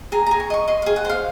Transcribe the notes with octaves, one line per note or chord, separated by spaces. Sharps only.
G#4 A#5
G#4 A#5
C#6
D#5 C#6
D#5 C6
G#4 F5
F#5
C5 F5